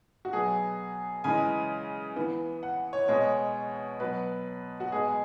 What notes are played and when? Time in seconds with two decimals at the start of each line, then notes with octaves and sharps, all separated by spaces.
0.25 F#4
0.33 B2 F#3 B3 G#4
1.24 C#3 E3 G#3 G#5
2.16 E3 B3
2.63 F#5
2.93 C#5
3.08 B2 G#3 B3 C#5
4.00 B2 F#3 B3 B4
4.80 F#4
4.92 B2 G#3 B3 G#4